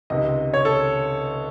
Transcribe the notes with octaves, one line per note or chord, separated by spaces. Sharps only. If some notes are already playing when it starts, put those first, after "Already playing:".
C#2 C3 D#3 D#5
C#5
A4